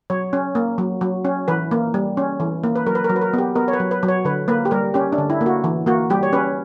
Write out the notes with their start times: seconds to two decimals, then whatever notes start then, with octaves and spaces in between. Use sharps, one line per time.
0.10 F#3 C#5
0.33 C#4
0.55 A#3
0.78 F#3
1.01 F#3
1.25 C#4
1.48 E3 B4
1.71 A#3
1.94 G3
2.17 C#4
2.40 E3
2.64 A#3
2.76 B4
2.86 F#3 A#4
2.95 B4
3.04 A#4
3.10 F#3
3.16 B4
3.21 A#4
3.33 B3 G4
3.55 B3 A#4
3.68 C#5
3.73 B4
3.80 F#3
3.91 B4
4.03 F#3
4.08 C#5
4.25 D3 B4
4.48 A#3 B4
4.65 G4
4.71 G3 A#4
4.94 C#4 G4
5.12 D4
5.18 D3
5.30 E4
5.41 A#3
5.46 F#4
5.64 E3
5.86 A#3 F#4
6.10 G3 G4
6.23 C#5
6.33 C#4 B4